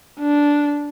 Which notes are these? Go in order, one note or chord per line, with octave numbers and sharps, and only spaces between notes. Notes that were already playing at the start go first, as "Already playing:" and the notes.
D4